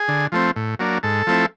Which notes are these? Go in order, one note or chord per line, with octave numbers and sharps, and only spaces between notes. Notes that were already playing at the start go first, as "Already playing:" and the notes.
Already playing: G#4
D3
F3 A3 C4
A2
F#3 A#3 D4
G#2 A4
F3 A3 C4 E4